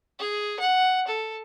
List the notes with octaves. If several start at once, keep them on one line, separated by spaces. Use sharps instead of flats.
G#4
F#5
A4